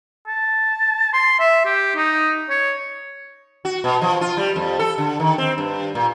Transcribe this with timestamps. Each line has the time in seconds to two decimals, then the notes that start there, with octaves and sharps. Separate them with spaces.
0.28 A5
1.13 C6
1.40 E5
1.65 G4
1.96 D#4
2.49 C#5
3.65 F#4
3.84 B2
4.02 F3
4.21 F4
4.37 G3
4.56 F2
4.79 A4
4.98 D3
5.20 D#3
5.38 C4
5.58 G2
5.95 A#2